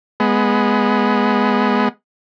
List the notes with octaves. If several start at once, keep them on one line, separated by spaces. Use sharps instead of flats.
G#3 B3